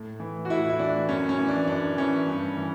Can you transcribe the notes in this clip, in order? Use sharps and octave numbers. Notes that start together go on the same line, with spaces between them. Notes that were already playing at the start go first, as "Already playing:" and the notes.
Already playing: A2
E3
F#4
A2 E4
E4
E3 D4
F#2 C#4
C#4
E3
D4
F#2 D4
E3 C#4
G2
E3